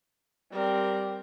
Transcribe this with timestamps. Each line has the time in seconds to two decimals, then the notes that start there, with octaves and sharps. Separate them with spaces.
0.52 G3 C4 A#4